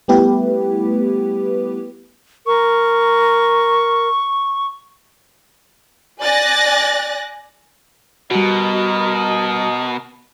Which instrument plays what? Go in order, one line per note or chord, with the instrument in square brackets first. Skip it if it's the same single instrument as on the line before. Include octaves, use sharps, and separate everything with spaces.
[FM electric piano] G3 A3 B3 E4 G4 B4
[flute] A#4 [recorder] C#6
[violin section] D5 G#5 F#6 A6 A#6
[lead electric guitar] B2 [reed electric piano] G3 F#4 [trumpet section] A#4 D#5